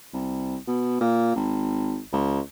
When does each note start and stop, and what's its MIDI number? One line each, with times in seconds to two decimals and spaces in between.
0.13 0.57 36
0.67 0.99 47
1.01 1.34 46
1.36 2.00 32
2.13 2.40 37